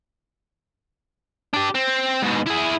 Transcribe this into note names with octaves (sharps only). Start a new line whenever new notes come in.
D4 G4
C4
G#2 B2
E4 G#4